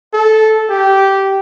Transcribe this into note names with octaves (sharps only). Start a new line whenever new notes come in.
A4
G4